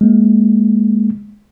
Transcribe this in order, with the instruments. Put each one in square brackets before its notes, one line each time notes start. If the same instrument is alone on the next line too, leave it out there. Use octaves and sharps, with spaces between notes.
[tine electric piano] G#3 A#3